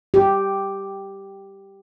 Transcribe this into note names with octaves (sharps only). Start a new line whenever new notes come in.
G4